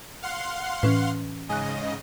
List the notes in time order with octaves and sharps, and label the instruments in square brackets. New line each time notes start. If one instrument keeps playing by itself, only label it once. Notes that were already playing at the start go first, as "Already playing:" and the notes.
[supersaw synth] F5 F#5 C6
[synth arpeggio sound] A2 [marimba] E3 C#4 B4
[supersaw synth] G#2 C#3 D#5 [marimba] G#5 F#6